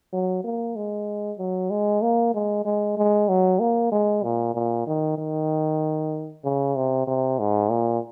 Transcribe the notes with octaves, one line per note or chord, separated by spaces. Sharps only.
F#3
A#3
G#3
F#3
G#3
A#3
G#3
G#3
G#3
F#3
A#3
G#3
A#2
A#2
D#3
D#3
C#3
C3
C3
G#2
A#2